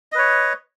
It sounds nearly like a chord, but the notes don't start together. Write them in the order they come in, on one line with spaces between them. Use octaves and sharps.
D#5 B4 C#5